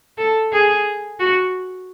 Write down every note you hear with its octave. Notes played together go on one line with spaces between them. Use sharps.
A4
G#4
F#4